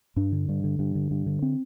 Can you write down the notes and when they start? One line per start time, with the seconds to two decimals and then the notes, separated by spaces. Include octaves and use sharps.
0.16 G2 D4
0.32 D3
0.49 G2
0.64 D3
0.79 G2
0.95 D3
1.11 G2
1.26 D3
1.42 C4